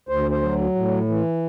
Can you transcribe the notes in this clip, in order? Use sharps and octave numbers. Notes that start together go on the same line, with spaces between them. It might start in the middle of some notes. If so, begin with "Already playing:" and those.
D2 C5
C5
F#3
A2
E3